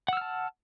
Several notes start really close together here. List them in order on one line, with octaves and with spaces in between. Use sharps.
F#5 E6 F6 A5